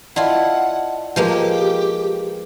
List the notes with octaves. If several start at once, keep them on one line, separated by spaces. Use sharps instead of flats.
E4 F4 D5 D#5 F#5 A5
F3 G#3 A#3 G4 B4